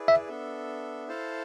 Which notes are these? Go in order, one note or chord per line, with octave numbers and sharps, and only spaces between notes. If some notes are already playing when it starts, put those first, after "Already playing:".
Already playing: E4 G#4 B4 D5
E5
B3 D4 A4 E5
E4 A4 C5 F5 A5